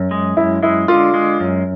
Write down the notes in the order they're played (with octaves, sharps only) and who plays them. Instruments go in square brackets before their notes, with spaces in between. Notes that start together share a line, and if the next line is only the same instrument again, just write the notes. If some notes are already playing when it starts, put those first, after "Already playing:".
Already playing: [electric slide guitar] F#2
G#3
[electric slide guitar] F#2 [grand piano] E4
[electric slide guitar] G#3 [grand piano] E4
[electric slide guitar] D3 [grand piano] F4
[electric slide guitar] G#3
F#2